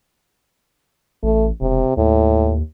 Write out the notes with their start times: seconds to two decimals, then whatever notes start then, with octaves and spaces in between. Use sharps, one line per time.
1.23 A1 A3
1.61 E1 C3
1.97 D#2 A2